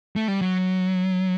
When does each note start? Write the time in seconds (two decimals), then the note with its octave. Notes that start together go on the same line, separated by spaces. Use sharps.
0.16 A3
0.28 G3
0.41 F#3